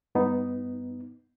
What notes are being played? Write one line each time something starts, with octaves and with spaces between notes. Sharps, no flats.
G2 B3 D#4